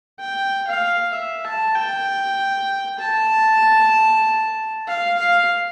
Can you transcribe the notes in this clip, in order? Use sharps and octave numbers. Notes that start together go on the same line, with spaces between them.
G5
F5
E5
A5
G5
A5
F5
F5